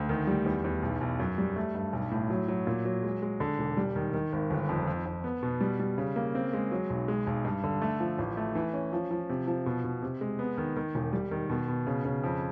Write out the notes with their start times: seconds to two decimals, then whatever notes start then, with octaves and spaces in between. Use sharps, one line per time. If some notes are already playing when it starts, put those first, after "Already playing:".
Already playing: D2
0.09 D#3
0.27 G3
0.46 E2
0.64 E2
0.83 B1
1.01 B1
1.20 F#2
1.38 G3
1.56 A3
1.75 G2
1.93 B1
2.11 A2
2.30 F#3
2.48 F#3
2.67 A#2
2.85 F#3
3.03 G#3
3.22 G#3
3.40 D3
3.58 E1
3.77 G3
3.96 D#3
4.14 D#3
4.32 G#1
4.50 G1
4.69 F2
4.88 F2
5.06 F2
5.24 B3
5.43 B2
5.61 G3
5.80 G3
5.98 C#3
6.16 A#3
6.35 C4
6.53 G#3
6.72 F#3
6.90 B1
7.08 G#3
7.27 B1
7.45 G2
7.64 D3
7.82 A3
8.00 F3
8.18 A1
8.37 A3
8.55 E3
8.74 C#4
8.93 F3
9.11 F3
9.29 C3
9.48 F3
9.66 B2
9.84 B2
10.03 C3
10.21 G#3
10.39 B3
10.58 D#3
10.76 D#3
10.95 E1
11.13 G3
11.31 D#3
11.50 B2
11.68 B2
11.87 C#3
12.05 C#3
12.24 F2